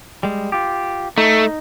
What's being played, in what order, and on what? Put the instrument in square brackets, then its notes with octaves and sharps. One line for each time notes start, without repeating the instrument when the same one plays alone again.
[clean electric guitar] G3 G#3
F4 G4
[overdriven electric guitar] A3 [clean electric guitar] D#4